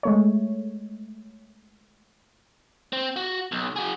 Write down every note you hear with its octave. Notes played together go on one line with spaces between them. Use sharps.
G#3 A3 C#5
C4
F#4
B1
F#4 G#4